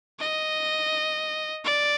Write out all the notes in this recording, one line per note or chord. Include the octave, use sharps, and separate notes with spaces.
D#5
D5